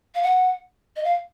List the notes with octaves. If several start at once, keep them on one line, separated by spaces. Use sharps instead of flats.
F5
F#5
D#5
F5